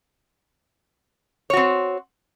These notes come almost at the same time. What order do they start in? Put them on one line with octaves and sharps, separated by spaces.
C#5 F#4 C4